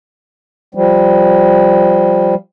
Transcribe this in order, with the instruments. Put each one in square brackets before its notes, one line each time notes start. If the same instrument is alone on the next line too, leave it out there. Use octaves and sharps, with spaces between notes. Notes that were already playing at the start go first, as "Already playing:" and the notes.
[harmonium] F3 G3